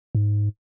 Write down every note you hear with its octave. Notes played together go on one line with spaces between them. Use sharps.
G#2